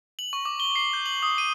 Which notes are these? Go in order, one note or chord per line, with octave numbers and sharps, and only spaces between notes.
F#7
C#6
D6
G7
C7
G6
F#7
D#6
D#7